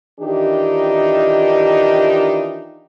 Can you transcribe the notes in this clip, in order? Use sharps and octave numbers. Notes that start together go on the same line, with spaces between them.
D#3 E3 D4 D#4 F4 G4